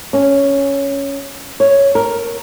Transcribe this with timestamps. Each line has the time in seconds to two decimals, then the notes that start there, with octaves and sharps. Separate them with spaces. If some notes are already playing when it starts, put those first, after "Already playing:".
0.13 C#4
1.60 C#5
1.95 A#4